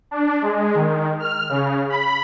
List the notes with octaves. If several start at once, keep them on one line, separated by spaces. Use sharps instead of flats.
D4
G#3
D#3
F6
C#3
B5